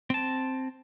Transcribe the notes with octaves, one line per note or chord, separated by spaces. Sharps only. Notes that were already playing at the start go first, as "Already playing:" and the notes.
C4 A5